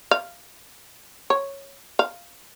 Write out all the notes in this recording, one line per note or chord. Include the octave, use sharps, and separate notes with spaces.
F5
C#5
F5